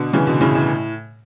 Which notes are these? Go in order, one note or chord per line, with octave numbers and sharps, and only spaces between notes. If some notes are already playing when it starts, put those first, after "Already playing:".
Already playing: B2 D3
C#3 E3
B2 D3
A2 C#3
A2